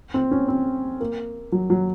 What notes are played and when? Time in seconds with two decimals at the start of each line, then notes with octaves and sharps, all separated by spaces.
0.14 C4
0.31 C#4
0.48 C4
1.00 A#3
1.52 F#3
1.70 F#3